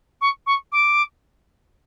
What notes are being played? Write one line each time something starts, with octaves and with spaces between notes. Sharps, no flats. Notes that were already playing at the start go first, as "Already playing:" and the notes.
C#6
C#6
D6